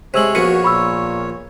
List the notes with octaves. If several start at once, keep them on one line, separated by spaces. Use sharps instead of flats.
C3 G#3 C5 C#5 E6 F#7
A#1 A#3 B3 F#4 C#7 D#7
A#2 B5 C#6 E6